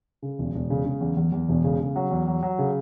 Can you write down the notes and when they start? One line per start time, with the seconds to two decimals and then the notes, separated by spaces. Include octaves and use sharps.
0.22 C#3
0.39 E1
0.54 E1
0.70 C#3
0.85 C#3
1.01 E2
1.17 E2
1.32 E2
1.49 E1
1.64 C#3
1.80 C#3
1.96 F#3
2.11 E2
2.27 F#3
2.43 F#3
2.58 C#3